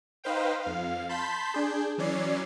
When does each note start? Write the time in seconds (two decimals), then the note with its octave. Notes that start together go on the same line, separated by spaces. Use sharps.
0.24 D#4 B4 C5 F5 G5
0.62 F2 F5
1.09 A5 B5 C6 G6 B6
1.52 D4 G#4 G6
1.98 E3 F#3 C#4 D5 C7